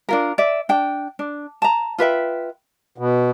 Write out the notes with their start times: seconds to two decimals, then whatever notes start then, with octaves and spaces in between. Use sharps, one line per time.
0.09 D4 F4 A#4
0.38 D5 E5
0.69 D4 G5
1.19 D4
1.62 A5 A#5
1.98 F4 B4 E5 G5
2.98 B2